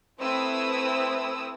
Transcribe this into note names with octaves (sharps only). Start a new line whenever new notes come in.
A3 C4 E4 B4 D#6 E6